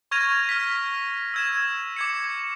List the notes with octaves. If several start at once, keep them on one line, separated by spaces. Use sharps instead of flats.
C#6 F6 G#6 A#6 D#7 F7
F6 G#6 B6
E6 G#6 E7
D6 G#6 C#7